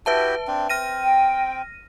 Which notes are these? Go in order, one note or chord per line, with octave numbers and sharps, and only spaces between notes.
E4 F#4 G4 B4 E5 A5
C4 D4
C4 F6 A#6 D#7
G5